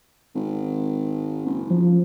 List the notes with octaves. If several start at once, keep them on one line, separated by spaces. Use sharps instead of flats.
G#1
F#1
F3